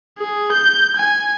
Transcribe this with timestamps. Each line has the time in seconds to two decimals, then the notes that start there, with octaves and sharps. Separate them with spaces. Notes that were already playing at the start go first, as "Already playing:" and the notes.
0.18 G#4
0.52 G6
0.96 G#5